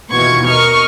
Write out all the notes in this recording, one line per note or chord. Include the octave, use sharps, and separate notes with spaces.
D#2 B2 E3 F4 C#6 G#6
A#4 D#5 C#6 F6